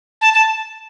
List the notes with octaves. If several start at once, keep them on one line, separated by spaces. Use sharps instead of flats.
A5
A5